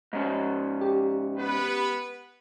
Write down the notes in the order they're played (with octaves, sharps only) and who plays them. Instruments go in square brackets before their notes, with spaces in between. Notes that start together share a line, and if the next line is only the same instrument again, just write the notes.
[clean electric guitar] G#2 C#4
[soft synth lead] G4
[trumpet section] B3 B4